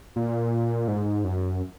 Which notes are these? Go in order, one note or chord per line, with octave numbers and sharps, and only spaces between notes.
A#2
G#2
F#2